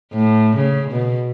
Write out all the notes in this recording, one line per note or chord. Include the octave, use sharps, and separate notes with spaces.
A2
C#3
B2